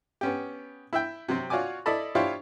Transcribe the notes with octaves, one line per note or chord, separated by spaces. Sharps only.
B3 C#4 G4
E4 E5 G5
C3 F#3 C4
F4 F#4 C#5 D5 G#5 D6
E4 A4 D5 D#5 A5 B5
D4 E4 F4 G4 C5 C#5